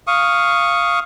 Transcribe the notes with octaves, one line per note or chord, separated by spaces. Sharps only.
F5 C#6 D#6